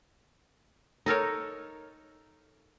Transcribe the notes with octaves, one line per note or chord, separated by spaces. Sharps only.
D#4 A4 A#4 C#5